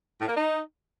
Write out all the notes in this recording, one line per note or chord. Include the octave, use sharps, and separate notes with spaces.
A2
A#3
D#4